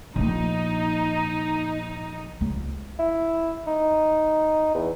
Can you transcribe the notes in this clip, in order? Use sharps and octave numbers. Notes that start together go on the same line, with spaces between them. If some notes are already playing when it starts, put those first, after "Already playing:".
A#1 A#3 D#4
C#2
E4
D#4
E2